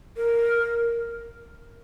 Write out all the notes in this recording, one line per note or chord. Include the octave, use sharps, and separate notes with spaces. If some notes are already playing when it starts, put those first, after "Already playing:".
A#4